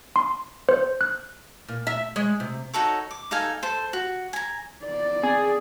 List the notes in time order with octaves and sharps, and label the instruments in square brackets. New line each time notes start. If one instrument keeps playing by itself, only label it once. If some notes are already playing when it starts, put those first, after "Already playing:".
[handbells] C6
C5
F#6
[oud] A#2
E5
G#3
C3
[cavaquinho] D#4 F#4 A4 C#5
D6
D#4 A4 F5 G#5
A4 C5
F#4
G#5 A#5
[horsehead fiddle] D5
[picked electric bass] C4 [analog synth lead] G#4